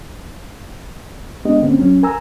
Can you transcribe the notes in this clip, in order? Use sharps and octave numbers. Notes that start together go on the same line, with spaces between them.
G#3 B3 D4 G4 D#5
G#2 D3 A#3 C4 C#4
F#3 C#4
A#4 G#5 A#5 E6